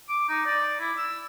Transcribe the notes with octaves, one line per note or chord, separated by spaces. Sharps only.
D6
D#4
D5
E4
E6